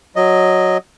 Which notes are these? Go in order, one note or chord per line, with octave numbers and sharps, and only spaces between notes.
F#3 D#5